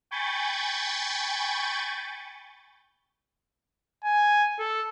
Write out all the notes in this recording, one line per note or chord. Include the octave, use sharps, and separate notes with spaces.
G5 G#5 B5 C#6 G6 A6
G#5
A4